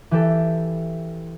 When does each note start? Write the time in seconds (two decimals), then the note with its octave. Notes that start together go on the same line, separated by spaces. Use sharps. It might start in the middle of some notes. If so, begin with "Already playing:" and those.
0.11 E3 G4 A4